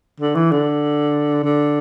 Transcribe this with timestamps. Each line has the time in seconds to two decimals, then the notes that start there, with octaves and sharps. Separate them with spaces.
0.20 D3
0.35 E3
0.51 D3
1.44 D3